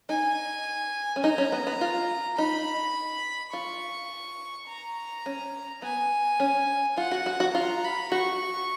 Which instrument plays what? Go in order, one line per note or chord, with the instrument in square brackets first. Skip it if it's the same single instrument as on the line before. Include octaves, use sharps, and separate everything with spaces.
[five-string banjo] D#4 [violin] G#5
[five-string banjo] C#4
[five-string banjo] D#4 [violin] A#5
[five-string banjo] C#4
B3
B3
F4
[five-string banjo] D#4 [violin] B5
[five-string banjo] F4 [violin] C#6
[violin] A#5
[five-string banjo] C#4
[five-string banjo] B3 [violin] G#5
[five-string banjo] C#4
[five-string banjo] F4 [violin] F#5
[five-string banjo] F#4
F#4
F#4
[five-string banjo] F4 [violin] A#5
[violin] B5
[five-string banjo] F#4 [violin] C#6